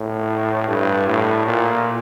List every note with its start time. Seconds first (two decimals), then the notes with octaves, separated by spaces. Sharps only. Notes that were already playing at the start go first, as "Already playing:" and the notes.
Already playing: A2
0.68 G2
1.07 A2
1.46 A#2